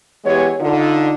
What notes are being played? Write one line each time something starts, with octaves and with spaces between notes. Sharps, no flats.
E3 G#3 B3 G4 C#5
D3 D#4 F4